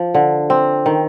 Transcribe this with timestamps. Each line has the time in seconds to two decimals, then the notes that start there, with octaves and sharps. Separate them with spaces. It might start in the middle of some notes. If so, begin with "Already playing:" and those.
Already playing: F3
0.14 D3
0.50 C4
0.86 D#3